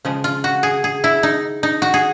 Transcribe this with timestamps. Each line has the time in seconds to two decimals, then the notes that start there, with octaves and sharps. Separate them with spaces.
0.05 C#3 F3 G#3
0.24 F4
0.44 F#4
0.63 G#4
0.84 G#4
1.04 E4
1.23 D#4
1.63 D#4
1.82 F#4
1.94 G#4